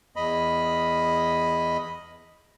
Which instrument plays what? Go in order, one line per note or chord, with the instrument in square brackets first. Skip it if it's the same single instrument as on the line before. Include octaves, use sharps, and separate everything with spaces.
[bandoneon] E2 D#5 B5